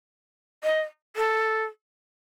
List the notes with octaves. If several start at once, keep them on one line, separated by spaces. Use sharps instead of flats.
D#5
A4